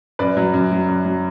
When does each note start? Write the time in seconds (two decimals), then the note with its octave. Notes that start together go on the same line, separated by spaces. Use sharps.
0.19 F#2 B4 D5
0.37 F#3
0.54 F#2
0.72 F#3
0.88 F#2
1.05 F#3